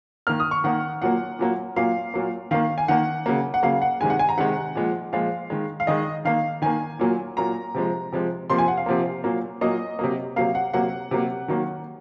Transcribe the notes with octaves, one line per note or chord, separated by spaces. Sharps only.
D#3 A#3 F6
D#6
C#6
D#3 A#3 F#5
A#2 F#3 A#3 F#5
A#2 F#3 A#3
A#2 F#3 A#3 F5
A#2 F#3 A#3
D#3 A#3 F5
G#5
D#3 A#3 F#5
C#3 F#3 A#3
F#5
C#3 F#3 A#3 F5
F#5
C3 D#3 G#3 G#5
F#5
G#5
A#5
C3 D#3 G#3 F#5
A#2 F3 G#3
A#2 F3 G#3 F5
D#3 G#3
F5
D#3 G#3 D#5
D#3 A#3 F5
D#3 A#3 G#5
A#2 F#3 A#3
A#2 F#3 A#3 A#5
C3 F3 G#3
C3 F3 G#3
C3 F3 A#3 C6
G#5
F#5
F5
C3 F3 A#3
A#2 F#3 A#3
A#2 F#3 A#3 D#5
C3 F#3 A#3
C3 F#3 A#3 F5
F#5
C3 F#3 A#3 F#5
C3 F#3 A#3
D#3 F#3 A#3